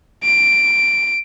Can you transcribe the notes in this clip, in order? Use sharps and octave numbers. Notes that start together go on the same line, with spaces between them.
D7